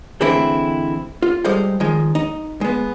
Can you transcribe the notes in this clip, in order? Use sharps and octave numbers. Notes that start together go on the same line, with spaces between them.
D3 E3 G#3 A3 C4 E4
F4
G3 G#3 A4 C5 F5
D#3 F3 G#3
D#4
G#3 B3